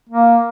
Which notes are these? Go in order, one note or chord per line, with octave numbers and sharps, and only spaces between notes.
A#3